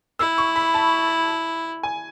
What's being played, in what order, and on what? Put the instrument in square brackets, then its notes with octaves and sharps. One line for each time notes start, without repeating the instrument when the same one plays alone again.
[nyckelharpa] E4 [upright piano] E6
[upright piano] C#6
B5
A5
G#5